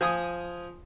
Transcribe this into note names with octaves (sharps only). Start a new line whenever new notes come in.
F3 G#5 D#6